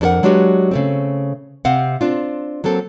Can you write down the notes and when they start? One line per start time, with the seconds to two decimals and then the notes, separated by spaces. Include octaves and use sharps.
0.01 F2 D4 A4 A#4 F#5
0.23 F#3 G#3 D4 F#4 G4 B4
0.71 C#3 A3 C4
1.65 C3 C4 F5 F#5
2.01 C4 D4 F4
2.64 F#3 A#3 C4 A4